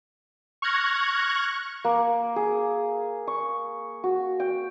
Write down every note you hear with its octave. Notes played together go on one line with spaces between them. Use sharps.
C#6 F6 F#6 G#6 A#6
A#3
G#4
C#6
F#4
G5